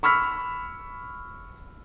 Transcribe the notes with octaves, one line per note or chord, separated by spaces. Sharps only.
B5 C#6 E6 F6 B6